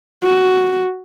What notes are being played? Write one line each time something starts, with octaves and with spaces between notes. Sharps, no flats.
F#4